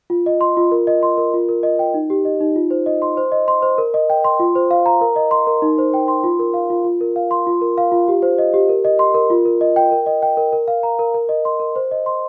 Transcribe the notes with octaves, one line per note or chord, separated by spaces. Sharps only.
F4
D#5
C6
F4
A#4
D#5
C6
A#4
F4
A#4
D#5
G5
D#4
G4
D#5
D#4
F4
C5
D#5
C6
C5
D#5
C6
C5
A#4
D#5
G5
C6
F4
C5
F5
A#5
A#4
D#5
C6
A#4
D#4
C5
G5
C6
F4
A#4
F5
F4
F4
A#4
F5
C6
F4
A#4
F5
F4
G4
C5
D#5
G4
A#4
D#5
C6
A#4
F4
A#4
D#5
G5
A#4
D#5
G5
A#4
A#4
F5
A#5
A#4
A#4
D#5
C6
A#4
C5
D#5
C6